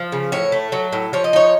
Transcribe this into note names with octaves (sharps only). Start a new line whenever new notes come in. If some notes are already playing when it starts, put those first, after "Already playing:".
Already playing: F3
C#3
A2 C#5
A3
F#3
A2
F3 C#5
D#5
D#4 C#5